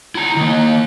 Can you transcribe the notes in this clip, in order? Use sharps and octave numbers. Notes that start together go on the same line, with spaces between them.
E4 A#5
D#3 A#3